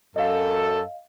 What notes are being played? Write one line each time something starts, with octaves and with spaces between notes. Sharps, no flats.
F#2 A4 D#5 F5